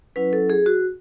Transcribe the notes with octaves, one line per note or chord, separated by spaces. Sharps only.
F#3 C#4 E4 B4
A4
G#4
F#4